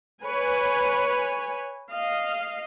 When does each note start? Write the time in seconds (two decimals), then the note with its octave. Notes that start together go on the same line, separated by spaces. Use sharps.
0.24 B4 C#5 G#5
1.92 D#5 F5